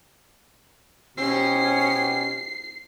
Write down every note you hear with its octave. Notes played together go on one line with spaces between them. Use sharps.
B2 C4 C#4 G4 C7